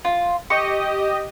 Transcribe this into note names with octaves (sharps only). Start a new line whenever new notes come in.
F4
G4 D#5 C#6